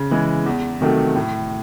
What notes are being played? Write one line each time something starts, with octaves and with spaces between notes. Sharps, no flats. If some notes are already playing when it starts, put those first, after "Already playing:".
Already playing: C#3
E3 G#3
E2
C3 D#3 F#3 A3
A2